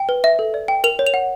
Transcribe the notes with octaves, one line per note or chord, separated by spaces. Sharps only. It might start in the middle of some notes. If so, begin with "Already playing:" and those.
Already playing: G5
B4
E5
A4
D5
G5
A#4 F7
C#5
F7
F#5